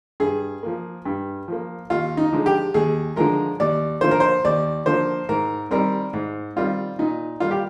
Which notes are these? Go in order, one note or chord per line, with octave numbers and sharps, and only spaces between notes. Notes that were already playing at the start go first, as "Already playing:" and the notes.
G2 G#4
F3 A#3
G2
F3 A#3
D#2 F4
D#4
D3 F3 G#3
G4
D#2 G#4
D3 F3 G#3 A#4
D#2 D5
D3 F3 A#3 C5
A#4
C5
D#2 D5
D3 F3 A#3 C5
G#2 A#4
D#3 G3 C4 A#4
G#2
D#3 G3 C4 F4
A#2 D#4
G3 A#3 F4
G4